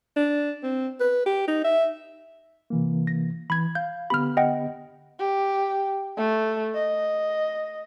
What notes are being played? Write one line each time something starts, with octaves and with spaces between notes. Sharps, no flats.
D4
C4
B4
G4
D#4
E5
C3 E3 A#3
A#6
E3 B5 G#6
F5 G6
D3 B3 G4 B5 F6
D#5 F#5 G5
G4
A3
D#5